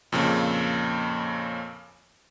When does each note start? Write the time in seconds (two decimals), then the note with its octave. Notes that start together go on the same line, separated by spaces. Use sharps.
0.12 F2 A#2 C#3